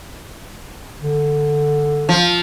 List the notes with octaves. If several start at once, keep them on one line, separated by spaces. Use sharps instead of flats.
D3
F3